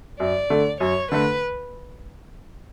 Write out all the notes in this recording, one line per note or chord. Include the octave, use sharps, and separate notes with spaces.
F#2 D5
D3 A3
F#2 C#5
D3 A3 B4